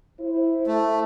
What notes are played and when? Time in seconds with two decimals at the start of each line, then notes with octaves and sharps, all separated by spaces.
0.20 E4 C5
0.68 A3